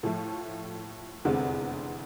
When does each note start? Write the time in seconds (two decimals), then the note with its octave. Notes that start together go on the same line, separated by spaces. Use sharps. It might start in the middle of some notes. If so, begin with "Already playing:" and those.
0.03 A2 F3 A3
1.25 F1 E2 D3 G#3 C4